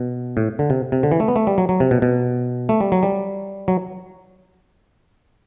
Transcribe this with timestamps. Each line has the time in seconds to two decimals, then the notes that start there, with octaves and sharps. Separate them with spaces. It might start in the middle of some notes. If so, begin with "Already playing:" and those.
Already playing: B2
0.37 A2
0.59 D3
0.70 C3
0.92 C3
1.03 D3
1.12 E3
1.20 A3
1.28 B3
1.36 A3
1.47 G3
1.58 F#3
1.69 F#3
1.80 C3
1.91 B2
2.02 B2
2.69 A3
2.81 G3
2.92 F#3
3.03 G3
3.68 F#3